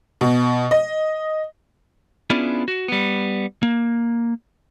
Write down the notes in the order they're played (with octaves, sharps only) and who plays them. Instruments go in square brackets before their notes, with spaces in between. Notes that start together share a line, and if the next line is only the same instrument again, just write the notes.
[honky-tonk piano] B2
D#5
[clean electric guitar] B3 C#4 D4 E4 F4 G#4
F#4
G3 B3
A#3